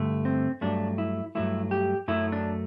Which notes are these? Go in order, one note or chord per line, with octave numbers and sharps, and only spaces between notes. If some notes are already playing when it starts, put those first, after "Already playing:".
Already playing: G2 D3 A3
C4
G2 F#3 A3 D4
E4
G2 F#3 A3 E4
G4
F#2 F#3 A3 E4
D4